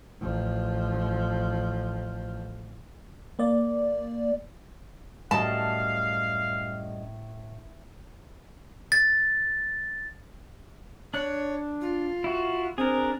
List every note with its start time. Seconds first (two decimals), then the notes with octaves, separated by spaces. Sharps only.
0.21 A1 F3
3.39 A#3 D5
5.31 F#2 A2 G3 D#5 F5 A5
8.92 A6
11.14 D4 C#5 F#6
11.81 F4
12.24 E4 F#4
12.78 C4 D4 G#4 A#4